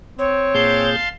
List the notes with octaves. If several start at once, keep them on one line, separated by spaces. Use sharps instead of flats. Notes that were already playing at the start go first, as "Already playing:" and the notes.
C4 C#5
A#2 G#4 F5 A5 C6 G6